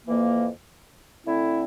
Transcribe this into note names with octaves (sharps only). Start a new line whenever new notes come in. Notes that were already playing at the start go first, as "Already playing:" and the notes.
F2 E3 A#3
D3 A3 C4 E4